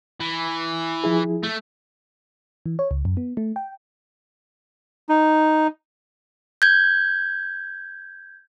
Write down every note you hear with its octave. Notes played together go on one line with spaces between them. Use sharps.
E3
F3 E4 G#4
A3
E3
C#5
C#2
F#2
B3
A3
G5
D#4
G6 G#6